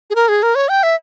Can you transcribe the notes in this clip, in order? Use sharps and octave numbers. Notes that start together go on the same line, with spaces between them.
G#4
A#4
G#4
A#4
C#5
G5
E5